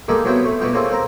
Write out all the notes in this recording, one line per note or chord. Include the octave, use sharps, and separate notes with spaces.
G3 G#3 A#3 D#4 G4 A4
C2 F#3 B3 E4 C5 G5
A3
B2 G3 E4 F4 G4
C#3 A#3 C4 F4 A4
C4 A#4